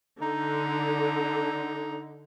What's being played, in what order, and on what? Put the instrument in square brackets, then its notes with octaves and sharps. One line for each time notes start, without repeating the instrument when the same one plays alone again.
[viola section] D3 [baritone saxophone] D#4